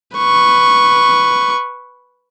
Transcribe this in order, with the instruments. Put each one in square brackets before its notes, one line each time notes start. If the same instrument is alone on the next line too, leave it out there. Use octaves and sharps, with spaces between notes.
[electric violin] B4 C#6